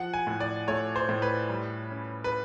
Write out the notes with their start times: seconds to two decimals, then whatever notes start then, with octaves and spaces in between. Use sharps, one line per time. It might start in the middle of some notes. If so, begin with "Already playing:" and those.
Already playing: F3 F#5
0.14 G#5
0.27 A2
0.40 D5
0.68 A3 C#5
0.96 C5
1.09 A2
1.22 B4
1.49 G3
1.91 C#4
2.24 B4